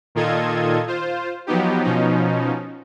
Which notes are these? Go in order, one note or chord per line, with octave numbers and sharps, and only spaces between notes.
A#2 D#3 F4 A4 D#5 G#6
F4 C5
F3 F#3 B3 D#4 G4
B2 F3 C#4 D#4